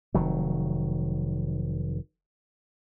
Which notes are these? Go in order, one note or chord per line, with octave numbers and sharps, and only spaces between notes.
F1 D#3 F#3